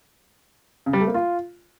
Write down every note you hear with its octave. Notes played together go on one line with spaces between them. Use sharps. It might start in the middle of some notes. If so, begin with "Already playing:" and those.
C#3
G3
A3
A#3
F4